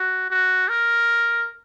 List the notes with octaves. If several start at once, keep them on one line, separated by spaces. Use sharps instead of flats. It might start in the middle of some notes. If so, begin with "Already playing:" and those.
Already playing: F#4
F#4
A#4